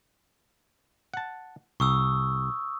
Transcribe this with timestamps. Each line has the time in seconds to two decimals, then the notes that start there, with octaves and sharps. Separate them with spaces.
1.14 F#5 A5
1.80 C2 C#6 D#6 E6